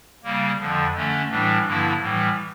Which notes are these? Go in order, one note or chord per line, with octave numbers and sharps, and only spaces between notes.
C#3 G3 A#3
F2 D3 F3
D3 A3 C#4
A2 E3 G3 D4
G2 D3 F3 A#3 E4
A2 E3 G3